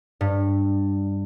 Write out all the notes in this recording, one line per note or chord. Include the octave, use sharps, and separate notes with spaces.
G2